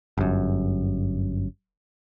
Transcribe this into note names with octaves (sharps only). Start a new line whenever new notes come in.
G1 F#2